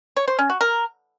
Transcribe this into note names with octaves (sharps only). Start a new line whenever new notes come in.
C#5
C5
C#4
F#4
A#4